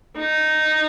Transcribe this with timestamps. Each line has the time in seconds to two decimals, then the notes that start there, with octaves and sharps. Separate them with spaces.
0.18 D#4